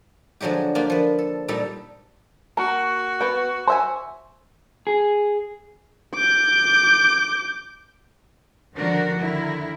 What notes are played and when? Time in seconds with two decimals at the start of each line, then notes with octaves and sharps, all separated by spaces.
0.41 D3 F3 F#3 G#3 G4
0.75 A#3 D4 F4 G4
0.90 F3 B4
1.18 A4
1.48 A#2 G3 D#4 A4 A#5
2.57 A#3 F#4
3.21 B3 G5
3.68 C5 E5 G#5
4.87 G#4
6.15 D6 G6
8.76 D3 D#3 F3 D4 F#4 A#4
9.18 D3 D#3 E4 A#4